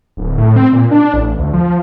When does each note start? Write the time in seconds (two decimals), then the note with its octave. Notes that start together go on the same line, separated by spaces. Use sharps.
0.17 D1
0.38 A2
0.56 C4
0.73 A#2
0.91 D4
1.13 A1
1.39 D2
1.53 F3